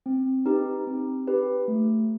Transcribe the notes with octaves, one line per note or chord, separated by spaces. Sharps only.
C4
D#4 G4 B4
C4
D#4 G4 B4
A3